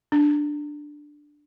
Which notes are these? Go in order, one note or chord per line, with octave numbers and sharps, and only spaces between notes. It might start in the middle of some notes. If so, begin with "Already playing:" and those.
D4